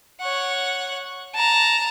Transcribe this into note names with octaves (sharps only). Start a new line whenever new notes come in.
C#5 F#5
A5 A#5